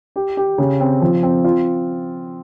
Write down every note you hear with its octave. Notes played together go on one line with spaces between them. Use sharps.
G4
G4
C#3
C4
F3
C4
F4